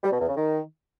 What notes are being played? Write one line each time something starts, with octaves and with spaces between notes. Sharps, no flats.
G3
B2
E2
C#3
D#3